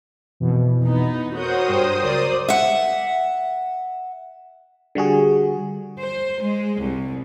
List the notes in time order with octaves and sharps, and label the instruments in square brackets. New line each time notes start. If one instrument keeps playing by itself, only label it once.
[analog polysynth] F2 B2 E3
[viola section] B3 D#4
[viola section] F#4 A#4 C#5 [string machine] C5 D#6 [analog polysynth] F#5 G6
[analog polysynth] G2 G3 G5
[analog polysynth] C#2 A#4 D#7 [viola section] F#3 D5
[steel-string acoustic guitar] E5 F#5
[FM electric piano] D3 G3 F#4 G#4
[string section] C5
G#3
C2